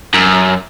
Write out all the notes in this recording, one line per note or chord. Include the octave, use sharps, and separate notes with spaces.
F#2